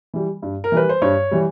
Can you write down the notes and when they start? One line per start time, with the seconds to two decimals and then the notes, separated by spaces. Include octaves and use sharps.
0.14 E3 G3
0.42 G2
0.64 A#4
0.72 E3 G3 B4
0.89 C5
1.01 G2 C#5
1.31 E3 G3